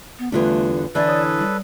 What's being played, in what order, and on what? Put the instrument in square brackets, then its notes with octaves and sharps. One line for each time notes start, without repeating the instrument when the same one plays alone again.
[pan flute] B3
[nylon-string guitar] E2 D3 G3 [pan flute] A3 [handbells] D4 F4 B4
[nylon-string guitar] D3 E3 [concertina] A4 B4 [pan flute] D5
[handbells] C#5 D#6
[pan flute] G3